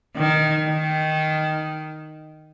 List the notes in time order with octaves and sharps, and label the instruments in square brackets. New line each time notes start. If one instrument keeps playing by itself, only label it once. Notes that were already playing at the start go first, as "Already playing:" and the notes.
[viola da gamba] D#3
D#3